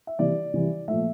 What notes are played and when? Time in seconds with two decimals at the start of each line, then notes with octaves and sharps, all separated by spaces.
0.07 E5
0.19 C3 E3 G3 D5
0.54 C3 E3 G3
0.88 A#2 F3 A3 E5